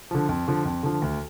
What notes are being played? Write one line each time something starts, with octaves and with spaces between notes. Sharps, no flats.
D3 F3
F2
D3 F3
F2
D3 F3
D2